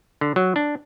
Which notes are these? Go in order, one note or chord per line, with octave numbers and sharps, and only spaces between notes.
D3
F#3
D4